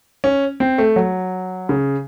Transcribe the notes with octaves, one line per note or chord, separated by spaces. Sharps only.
C#4
C4
A3
F#3
C#3